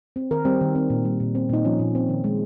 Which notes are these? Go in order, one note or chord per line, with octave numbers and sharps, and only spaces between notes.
C4
D#3 A#4
G3 C4
D#3
C4
A#2
G3
A#2
C4
A#2 D#4
F3 C#4
A#2
C4
D#3
G#3